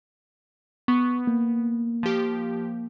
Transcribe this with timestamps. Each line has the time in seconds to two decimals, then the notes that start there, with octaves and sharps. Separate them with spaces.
0.88 B3 C#6
1.27 A#3
2.03 F3 G4